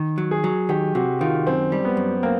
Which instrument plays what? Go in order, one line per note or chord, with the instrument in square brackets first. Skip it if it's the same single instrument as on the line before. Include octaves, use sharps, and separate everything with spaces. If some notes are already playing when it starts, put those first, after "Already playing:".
Already playing: [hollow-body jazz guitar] D#3
F#3
[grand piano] G#4
[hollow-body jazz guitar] F#3
[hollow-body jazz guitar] D#3 [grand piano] G4
[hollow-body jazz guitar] C3 [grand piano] F#4
[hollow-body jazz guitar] D#3 [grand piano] F4
[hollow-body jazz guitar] F#2 [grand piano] C4
[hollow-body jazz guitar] G3
[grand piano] B3
[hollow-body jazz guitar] F#2
[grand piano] A#3 [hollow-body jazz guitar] C4